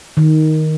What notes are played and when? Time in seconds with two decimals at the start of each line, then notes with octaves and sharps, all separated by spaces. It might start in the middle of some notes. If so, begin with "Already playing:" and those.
0.17 D#3